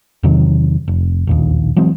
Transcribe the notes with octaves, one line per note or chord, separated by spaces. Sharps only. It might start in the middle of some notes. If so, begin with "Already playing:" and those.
E2 C3 D#3 F#3
F1
E1 A#1 D#2
E3 F#3 G#3 C4